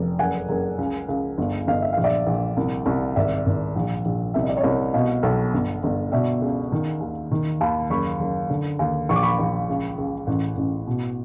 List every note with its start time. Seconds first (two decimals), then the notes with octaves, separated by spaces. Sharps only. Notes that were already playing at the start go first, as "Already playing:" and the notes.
Already playing: F1
0.19 F#1 F#5 G#5
0.49 F#1
0.78 C#2
1.08 C#2
1.38 G1
1.67 G1 D#5 F5
1.82 E5
1.93 A#1 F5
2.04 D5 E5
2.27 A#1
2.57 C2
2.86 C2
3.16 G#1 D5 E5
3.46 G#1
3.76 A#1
4.05 A#1
4.34 C2 E5
4.43 D#5
4.49 D5
4.57 C#5 D#5
4.64 C2
4.94 B2 D#5 F5
5.23 B1
5.54 G1
5.83 G1
6.12 B2 D5 E5
6.42 C#2
6.72 D#3
7.01 D#2
7.31 D#3
7.61 D#2 A5 B5
7.90 F#1 B5 C#6
8.20 F#1
8.50 D3
8.79 D#2
9.09 A#1 C#6
9.16 D6
9.23 B5 C#6
9.39 A#1
9.69 C#2
9.98 C#2
10.27 A1
10.57 A1
10.87 B2